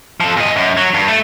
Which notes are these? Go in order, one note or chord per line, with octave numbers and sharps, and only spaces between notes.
F3 A4
A#2 D#5
F#2
F#3
G2
A3